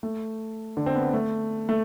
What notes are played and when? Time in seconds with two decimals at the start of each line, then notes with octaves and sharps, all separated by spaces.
0.03 A3
0.77 D3
0.86 C4
0.95 B3
1.14 A3
1.69 A3